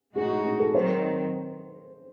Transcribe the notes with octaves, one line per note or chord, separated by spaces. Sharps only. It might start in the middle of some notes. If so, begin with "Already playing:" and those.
A2 G#3 D#4 F#4 G#4
G#4
A4
D#3 F#3 C4 C5